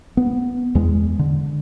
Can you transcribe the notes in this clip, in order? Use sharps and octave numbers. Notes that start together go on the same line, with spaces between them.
B3
E2 G#3
D3